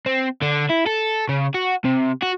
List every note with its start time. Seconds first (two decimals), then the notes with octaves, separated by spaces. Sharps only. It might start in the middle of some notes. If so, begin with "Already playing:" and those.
0.06 C4
0.42 D3
0.70 E4
0.87 A4
1.29 C#3
1.55 F#4
1.84 C3
2.22 F#4